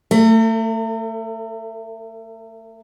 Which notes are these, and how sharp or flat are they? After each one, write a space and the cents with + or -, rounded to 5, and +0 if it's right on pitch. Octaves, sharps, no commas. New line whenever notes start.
A3 +25 A#4 -45